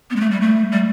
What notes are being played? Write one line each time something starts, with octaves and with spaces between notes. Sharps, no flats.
B3
G#3
A3
G3
A3
G3